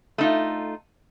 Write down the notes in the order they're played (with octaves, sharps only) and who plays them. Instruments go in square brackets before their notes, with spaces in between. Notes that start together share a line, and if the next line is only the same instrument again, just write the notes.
[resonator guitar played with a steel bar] A3 D#4 F4